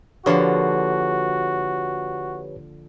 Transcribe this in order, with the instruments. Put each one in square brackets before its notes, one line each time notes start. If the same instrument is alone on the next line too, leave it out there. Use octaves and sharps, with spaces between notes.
[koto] D3 F3 A#3 [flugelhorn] F#4 [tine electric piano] G4 B4 C#5